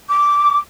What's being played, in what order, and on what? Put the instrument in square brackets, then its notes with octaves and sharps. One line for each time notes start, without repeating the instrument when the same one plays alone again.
[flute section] D6